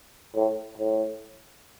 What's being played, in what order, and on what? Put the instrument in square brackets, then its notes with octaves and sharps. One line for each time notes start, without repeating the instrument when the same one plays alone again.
[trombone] A2
A2